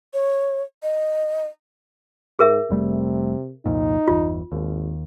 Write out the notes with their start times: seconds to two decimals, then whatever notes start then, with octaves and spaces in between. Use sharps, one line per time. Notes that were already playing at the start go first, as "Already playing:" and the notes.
0.14 C#5
0.83 D#5
2.39 G#2 G#4 A#4 E5
2.70 F1 C3 G3 A3
3.66 C2 F2 A#2 D#4
4.08 G1 E2 F4
4.52 G#1 D#2